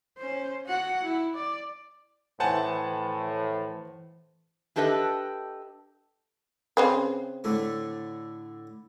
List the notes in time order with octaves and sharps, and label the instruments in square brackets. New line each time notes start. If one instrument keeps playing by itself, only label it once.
[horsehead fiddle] C#4 C5
F#4 F#5
E4
D5
[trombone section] A2 [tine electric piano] E3 C5 [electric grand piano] F#5 G#5 A5
[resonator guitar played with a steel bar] D4 G4 A4 B4 D#5 E5
[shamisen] C#3 C4 B4
[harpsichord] A2 D3 A3